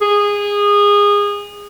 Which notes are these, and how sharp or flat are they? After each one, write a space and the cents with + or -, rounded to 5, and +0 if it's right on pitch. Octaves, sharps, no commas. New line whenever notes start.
G#4 -20